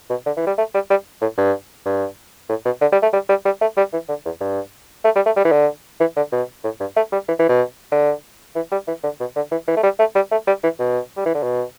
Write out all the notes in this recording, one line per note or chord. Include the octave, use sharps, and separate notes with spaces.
B2
D3
E3
G3
A3
G3
G3
A2
G2
G2
A2
B2
D3
G3
A3
G3
G3
G3
A3
G3
E3
D3
E2
G2
A3
G3
A3
G3
E3
D3
E3
D3
B2
A2
G2
A3
G3
E3
E3
B2
D3
E3
G3
E3
D3
B2
D3
E3
E3
A3
G3
A3
G3
A3
G3
E3
B2
G3
E3
D3
B2